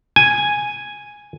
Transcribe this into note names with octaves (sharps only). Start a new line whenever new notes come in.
G#5